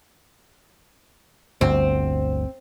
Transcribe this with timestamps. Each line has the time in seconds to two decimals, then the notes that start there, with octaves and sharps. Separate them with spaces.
1.61 G1 D2 C4